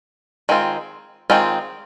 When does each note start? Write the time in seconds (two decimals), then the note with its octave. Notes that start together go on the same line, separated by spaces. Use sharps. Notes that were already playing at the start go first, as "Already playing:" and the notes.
0.49 D#3 G#3 C4 F4
1.30 D#3 G#3 C4 F4